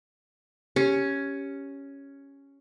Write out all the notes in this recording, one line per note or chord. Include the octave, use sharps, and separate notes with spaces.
C#4 G4